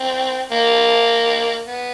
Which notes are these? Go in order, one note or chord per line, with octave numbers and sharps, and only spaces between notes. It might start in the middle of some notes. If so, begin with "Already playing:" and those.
Already playing: C4
A#3
B3